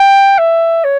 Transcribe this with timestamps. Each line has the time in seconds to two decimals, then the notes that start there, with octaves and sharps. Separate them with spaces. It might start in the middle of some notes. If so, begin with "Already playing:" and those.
Already playing: G5
0.38 E5
0.84 C#5